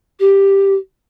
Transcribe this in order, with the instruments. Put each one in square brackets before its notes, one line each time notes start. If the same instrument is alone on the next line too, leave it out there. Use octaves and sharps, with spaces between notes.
[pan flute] G4